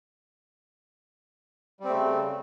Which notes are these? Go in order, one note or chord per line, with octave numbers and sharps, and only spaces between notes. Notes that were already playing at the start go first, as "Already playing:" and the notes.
C#3 G3 A3 C4